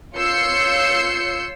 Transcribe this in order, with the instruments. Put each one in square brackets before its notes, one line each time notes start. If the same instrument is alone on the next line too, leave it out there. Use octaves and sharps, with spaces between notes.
[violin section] F4 C#5 E6 G6 C7 C#7